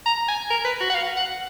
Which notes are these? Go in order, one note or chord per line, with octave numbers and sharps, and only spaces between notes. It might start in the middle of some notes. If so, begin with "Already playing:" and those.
A#5
G#5
A#4
B4
F#4
F#5
F5
F#5